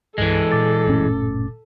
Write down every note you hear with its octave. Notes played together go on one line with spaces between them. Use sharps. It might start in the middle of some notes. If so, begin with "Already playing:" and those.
C2 G2 E3 G#3 A4
A#2 D6 A6
F#1 A2 C#4